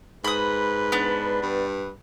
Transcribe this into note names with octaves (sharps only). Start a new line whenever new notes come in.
G#2 B4 B5 D#6
B3 D4
G2